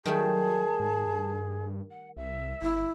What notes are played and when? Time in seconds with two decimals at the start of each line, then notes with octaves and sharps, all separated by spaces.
0.06 D#3 F#3 G3 A3 G#4 A5
0.80 G#2
1.07 G2
1.91 F#5
2.17 C2 E5
2.62 G1 E4